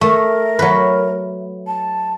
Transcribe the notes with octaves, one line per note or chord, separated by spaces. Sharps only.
A3 A#4
F#3 B4
A5